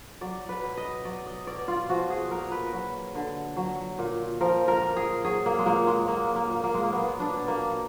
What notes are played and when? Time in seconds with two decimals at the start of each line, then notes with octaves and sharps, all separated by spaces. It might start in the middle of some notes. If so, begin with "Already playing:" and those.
0.21 F#3 D5
0.49 B4
0.63 B2
0.77 D#5
1.05 F#3 D5
1.26 D#5
1.47 B2 D5
1.68 F4
1.89 F3 F#4
2.10 G#4
2.31 A#2 A#4
2.52 B4
2.73 F#3
3.15 D3
3.57 F#3
3.99 A#2
4.41 F3 A#4
4.68 A#4
4.82 A#2
4.96 G#4
5.25 F#3 G#4
5.46 A#3
5.59 G#3
5.66 A#2 A#3
5.87 G#3
6.08 F#3 A#3
6.36 A#3
6.50 A#2
6.64 A#3
6.74 G#3
6.83 A#3
6.92 F#3 B3
7.20 D4
7.34 B2
7.48 A#3